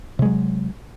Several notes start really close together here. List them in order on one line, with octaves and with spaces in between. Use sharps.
C3 G#3 F#3